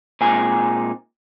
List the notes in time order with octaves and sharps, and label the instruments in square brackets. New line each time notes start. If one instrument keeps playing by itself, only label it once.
[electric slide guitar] A#2 G#3 C4 D#4 G#5